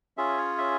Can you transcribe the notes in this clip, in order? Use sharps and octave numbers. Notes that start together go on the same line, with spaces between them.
C#4 F4 G#4 E5
C#5
E5